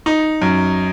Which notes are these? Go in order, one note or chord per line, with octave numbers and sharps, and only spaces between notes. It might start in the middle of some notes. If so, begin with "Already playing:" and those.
D#4
F#2